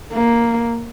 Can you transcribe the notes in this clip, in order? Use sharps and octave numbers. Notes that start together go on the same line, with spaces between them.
A#3